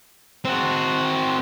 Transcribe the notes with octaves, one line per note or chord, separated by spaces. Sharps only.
C4 F#4